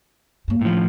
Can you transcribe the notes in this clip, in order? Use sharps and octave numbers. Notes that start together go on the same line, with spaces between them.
G2 A#3
A2 F3 C#4